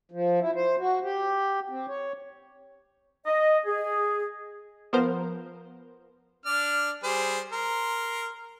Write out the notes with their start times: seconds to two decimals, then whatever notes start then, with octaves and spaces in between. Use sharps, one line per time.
0.11 F3
0.40 E4
0.55 C5
0.79 F#4
1.03 G4
1.70 C4
1.88 C#5
3.26 D#5
3.65 G#4
4.93 F3 B3 A#4 C5
6.46 D4 D5 F6
7.04 G3 G#4 C5
7.52 A#4 C6